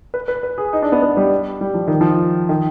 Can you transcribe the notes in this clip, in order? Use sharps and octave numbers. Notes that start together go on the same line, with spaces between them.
B4
B4
B4
G#4
D#4
D4
B3
B3
G3
G3
F3
D#3
F3
D#3